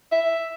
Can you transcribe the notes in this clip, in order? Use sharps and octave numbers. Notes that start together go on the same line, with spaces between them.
E5